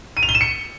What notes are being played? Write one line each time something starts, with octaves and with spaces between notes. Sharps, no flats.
D#7
F7
G7
E7
C#7